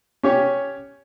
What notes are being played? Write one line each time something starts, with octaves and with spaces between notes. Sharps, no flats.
C#4 G4 C#5